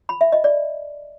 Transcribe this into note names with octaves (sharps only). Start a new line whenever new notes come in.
B5
E5
D#5
D5